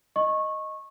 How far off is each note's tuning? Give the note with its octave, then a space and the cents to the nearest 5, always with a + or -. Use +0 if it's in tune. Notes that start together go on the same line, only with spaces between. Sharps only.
D#5 +0 C#6 -20